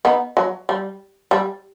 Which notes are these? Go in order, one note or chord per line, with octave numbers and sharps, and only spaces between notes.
B3 D#4
F#3
G3
G3